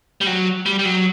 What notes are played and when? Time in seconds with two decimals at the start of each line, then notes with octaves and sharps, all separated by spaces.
0.21 G3
0.26 F#3
0.66 G3
0.79 G3
0.85 F#3